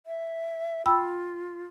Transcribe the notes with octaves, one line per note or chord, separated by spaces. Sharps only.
E5
F4 G5 B5 E6